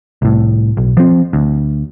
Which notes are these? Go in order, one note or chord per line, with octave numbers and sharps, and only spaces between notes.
C2 A2
B1
F3 C4
D2